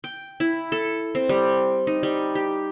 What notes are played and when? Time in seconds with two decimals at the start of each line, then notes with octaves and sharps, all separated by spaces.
0.04 G5
0.40 E4
0.72 A4
1.15 C4
1.29 G3
1.87 D#4
2.03 G3
2.35 G4